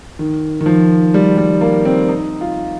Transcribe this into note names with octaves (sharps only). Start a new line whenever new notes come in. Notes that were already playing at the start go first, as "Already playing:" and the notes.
D#3
D#3
F3
G3
G3
A#3
C4
D#4
F4